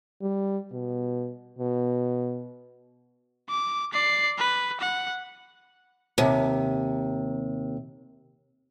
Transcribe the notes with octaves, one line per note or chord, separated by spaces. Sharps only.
G3
B2
B2
D6
D5 C7
B4
F#5
D#2 C3